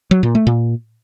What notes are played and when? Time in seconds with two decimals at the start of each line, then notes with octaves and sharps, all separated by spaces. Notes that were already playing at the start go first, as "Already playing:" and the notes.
0.11 F#3
0.23 A#2
0.35 A3
0.47 A#2